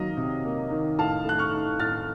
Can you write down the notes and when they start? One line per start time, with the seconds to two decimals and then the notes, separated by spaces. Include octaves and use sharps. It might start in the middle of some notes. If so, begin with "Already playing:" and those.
Already playing: D#3 F#3 A#3 D#5 F5
0.17 C3
0.44 A#3
0.71 D#3
0.98 A2 F5 A5
1.25 A3 F#6
1.38 C#6 F6
1.53 D#4
1.79 A2 F6 A6